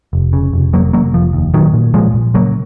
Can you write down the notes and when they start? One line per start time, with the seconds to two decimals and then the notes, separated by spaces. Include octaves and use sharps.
0.13 F1
0.33 C#3
0.53 F1
0.73 F1 F#3 A#3
0.93 F1 F#3 A#3
1.13 F1 F3
1.33 D#2
1.54 A#2 D#3 F#3
1.74 A#2
1.94 A#2 F3 G#3
2.14 A#2
2.34 C#3 F#3 A#3